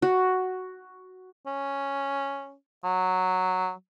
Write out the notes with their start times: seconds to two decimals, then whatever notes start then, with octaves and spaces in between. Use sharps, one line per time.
0.02 F#4
1.46 C#4
2.84 F#3